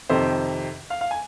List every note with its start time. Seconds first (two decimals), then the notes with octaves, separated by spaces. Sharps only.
0.10 F2 C3 D#3 C5
0.90 F5
1.01 F5
1.11 G#5